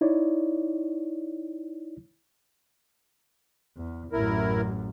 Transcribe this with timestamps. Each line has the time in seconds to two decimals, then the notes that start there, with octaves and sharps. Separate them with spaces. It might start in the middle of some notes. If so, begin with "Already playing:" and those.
0.01 D#4 E4 C#5 D5
3.77 E2
4.13 A1 F#2 E4 A#4